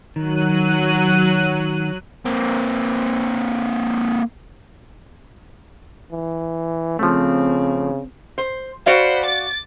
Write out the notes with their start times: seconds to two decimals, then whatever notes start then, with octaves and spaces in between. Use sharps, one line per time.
0.16 D#3 F#3 F#6 D#7
2.25 A#3 C4
6.12 E3
6.99 C#3 F3 A3 C4
8.38 C5
8.86 F#4 C5 D5 F5 B5
9.25 D6 A6